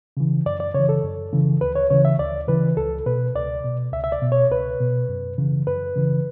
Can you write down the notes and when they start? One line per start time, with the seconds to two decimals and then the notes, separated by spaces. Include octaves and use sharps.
0.17 C#3 E3
0.46 F#2 D5
0.60 D5
0.74 C#3 E3 C#5
0.89 A4
1.03 F#2
1.32 C#3 E3
1.61 D2 B4
1.75 C#5
1.90 C#3 E3 C#5
2.05 E5
2.19 D2 D5
2.48 C#3 E3 B4
2.77 C#2 A4
3.06 B2 B4
3.35 C#2 D5
3.64 B2
3.93 C#2 E5
4.04 E5
4.12 D5
4.21 B2
4.32 C#5
4.51 C#2 B4
4.80 B2
5.09 F#2
5.38 C#3 E3
5.67 F#2 B4
5.96 C#3 E3